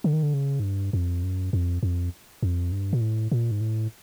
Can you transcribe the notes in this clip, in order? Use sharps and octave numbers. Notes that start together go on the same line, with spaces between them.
D3
D#3
D3
C#3
G#2
G2
F2
F#2
F2
F2
F2
G2
A#2
A2
A#2
G#2
A2